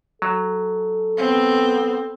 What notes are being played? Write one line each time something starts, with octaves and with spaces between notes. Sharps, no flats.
F#3 A4
B3 C4